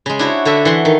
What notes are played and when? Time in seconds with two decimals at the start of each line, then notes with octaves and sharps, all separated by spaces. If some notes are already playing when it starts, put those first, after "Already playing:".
0.06 C#3 G#3
0.19 D4 E4 F#4 C5 C#5
0.45 D3 F#4 A4 E5
0.65 E3 F#5 C6
0.85 D#3